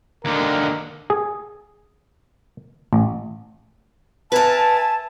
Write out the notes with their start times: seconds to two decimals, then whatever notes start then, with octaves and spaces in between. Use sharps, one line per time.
0.25 D#2 D3 A#4
1.10 G#4
2.93 A1
4.32 A#4 B4 E5 G#5 A5